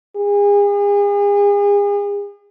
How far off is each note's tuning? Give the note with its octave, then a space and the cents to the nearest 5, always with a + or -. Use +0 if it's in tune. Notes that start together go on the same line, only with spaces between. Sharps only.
G#4 -40